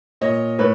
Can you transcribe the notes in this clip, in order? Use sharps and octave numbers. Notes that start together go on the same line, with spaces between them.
A#2 C#5 D#5
A2 B4 C#5